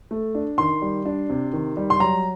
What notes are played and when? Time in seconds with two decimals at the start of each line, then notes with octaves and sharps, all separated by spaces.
0.11 A3
0.35 D4
0.58 D#3 C6
0.82 G3
1.06 D4
1.30 C3
1.53 D#3
1.77 G3
1.90 C6
2.00 F#3 A#5